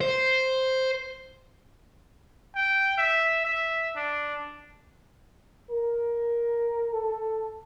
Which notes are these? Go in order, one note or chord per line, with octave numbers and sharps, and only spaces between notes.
C5
G5
E5
E5
D4
A#4
A4